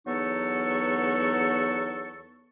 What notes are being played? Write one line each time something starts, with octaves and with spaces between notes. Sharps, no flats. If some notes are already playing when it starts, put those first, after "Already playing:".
E2 F#3 B3 D#4 A4 C#6